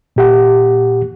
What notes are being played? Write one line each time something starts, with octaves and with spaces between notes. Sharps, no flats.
A#2 G4 F#5